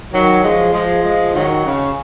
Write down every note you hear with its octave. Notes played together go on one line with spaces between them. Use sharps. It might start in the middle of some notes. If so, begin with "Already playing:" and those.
D#3 F#3
F3 G#3
F3 G#3
F3 G#3
D#3 F#3
C#3